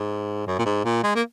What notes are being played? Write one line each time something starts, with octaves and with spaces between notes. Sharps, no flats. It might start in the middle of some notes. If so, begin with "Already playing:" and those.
Already playing: G#2
F#2
A#2
G#2
A#2
G#3
A#3